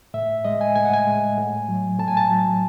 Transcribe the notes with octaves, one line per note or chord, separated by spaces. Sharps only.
A2 E5
G#3 D#5
G#5
A2 G#5
F#5
G#5
G#3
A2
F#3
A2 A5
G#5
A5
F#3